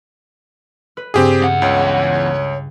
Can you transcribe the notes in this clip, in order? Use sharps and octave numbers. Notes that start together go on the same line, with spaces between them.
B4
G2 C#3 C4 G4 G#4
E2 F#5
C#2 C#5